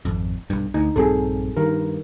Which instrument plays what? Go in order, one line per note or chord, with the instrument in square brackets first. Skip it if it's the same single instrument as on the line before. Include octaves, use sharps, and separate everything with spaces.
[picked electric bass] G#1 F2
B1 G2
[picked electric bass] D2 [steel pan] D#4
[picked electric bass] A#1 G2 C4 [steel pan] G#4 A4
[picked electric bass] G2 [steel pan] D#3 A#4